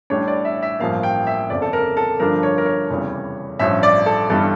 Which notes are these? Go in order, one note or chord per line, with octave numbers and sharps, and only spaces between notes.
A1 A2 G3 D4 C#5
D5
E5
E5
A1 G2 F3 A#3 F5
G5
E5
G1 F2 C#3 F3 D5
A4
A#4
A4
G2 D3 F3 A3 D4 A#4
C#5
A#4
C#5
F1 E2 C#3 E3 G3
A1 G2 F3 C#4 E5
D5
A4
G1 G2 E3 G3 D4 A4